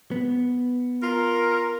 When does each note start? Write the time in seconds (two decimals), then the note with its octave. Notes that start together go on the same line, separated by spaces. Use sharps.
0.11 B3
1.03 F4 A#4